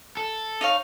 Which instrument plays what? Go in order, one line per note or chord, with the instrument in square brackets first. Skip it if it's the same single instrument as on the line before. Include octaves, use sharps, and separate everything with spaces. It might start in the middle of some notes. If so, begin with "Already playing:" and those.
[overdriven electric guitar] A4
[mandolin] D#4 C#5 F5